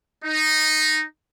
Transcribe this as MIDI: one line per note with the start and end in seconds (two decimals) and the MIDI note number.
0.24 1.04 63